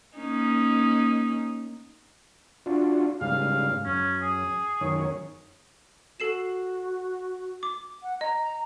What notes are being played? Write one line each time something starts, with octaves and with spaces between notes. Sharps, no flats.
A#3 C#4 D#4
D4 F4 F#4
G#2 C#3 G3 F5
F#2 C#4
G#4
F#2 D#3 C#5
F#4 A4 C7 E7
D6
F#5
D#5 A#5